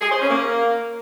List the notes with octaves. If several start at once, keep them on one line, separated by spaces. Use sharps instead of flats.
G#4
C5
C#4
A#3